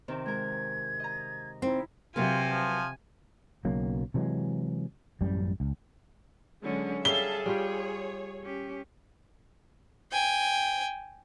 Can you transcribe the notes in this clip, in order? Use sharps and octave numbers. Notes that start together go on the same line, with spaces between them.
C3 D#3 C4
G#3 A#4 G#6
D#5 A#5
C4 D#4 E4
C3 F#3 F4 A#4 B4 G#5
F3
B1 C#3 F#3 A#3
C3 E3 F#3 G#3
A1 F#2 G3
C#2
D3 F#3 G#3 C#4
G3 G#4 A4 C#5 E5 F5 A5 G7
G3 F4 G4 C#5
C#4 G4
G5 G#5